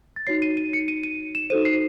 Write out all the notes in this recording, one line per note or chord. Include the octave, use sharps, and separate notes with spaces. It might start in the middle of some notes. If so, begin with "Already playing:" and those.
A6
D#4 F#4 C#5 C7
D#7
D#7
C#7
D#7
D#7
E7
D#4 F#4 A4 C5 D#7
C7